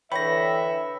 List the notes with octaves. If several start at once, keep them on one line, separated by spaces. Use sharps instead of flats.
D3 E3 B4 C#5 E5 G5 B5 A#6